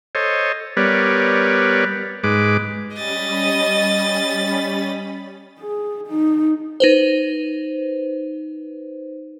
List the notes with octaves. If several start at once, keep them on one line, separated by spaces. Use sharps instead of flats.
A4 C5 C#5 D#5
G3 B3 A#4 B4 C#5 D5
G#2 G#3 B4 D6
G3 C#4 D#5 B5 A6
G#4
D#4
D#4 B4 C5